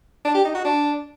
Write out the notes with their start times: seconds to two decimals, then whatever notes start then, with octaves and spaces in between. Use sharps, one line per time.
0.25 D4
0.35 G4
0.45 D#4
0.55 F#4
0.65 D4